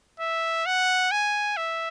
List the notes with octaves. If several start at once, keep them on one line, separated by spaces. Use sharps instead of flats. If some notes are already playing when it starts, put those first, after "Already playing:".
E5
F#5
G#5
E5